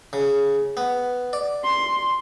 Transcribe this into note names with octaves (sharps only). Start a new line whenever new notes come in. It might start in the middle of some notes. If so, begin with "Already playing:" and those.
C#3
B3
D5
C6